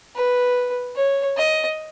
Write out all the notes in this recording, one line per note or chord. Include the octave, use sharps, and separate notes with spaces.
B4
C#5
D#5